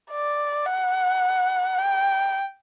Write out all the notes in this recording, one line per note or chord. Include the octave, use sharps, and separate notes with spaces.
D5
F#5
G5